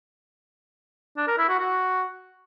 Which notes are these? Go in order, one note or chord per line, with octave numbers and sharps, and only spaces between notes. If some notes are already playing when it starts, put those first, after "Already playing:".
D4
A#4
E4
F#4
F#4